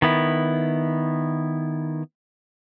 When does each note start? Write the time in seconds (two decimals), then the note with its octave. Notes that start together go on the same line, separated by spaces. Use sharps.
0.02 D#3 B3 E4